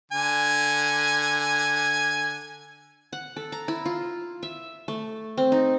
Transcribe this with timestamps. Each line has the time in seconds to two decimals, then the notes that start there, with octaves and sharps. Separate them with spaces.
0.12 D3 G#5
3.13 F#5
3.36 A4
3.52 A#5
3.68 E4
3.85 F4
4.43 E5
4.88 A3
5.38 C4
5.52 D#4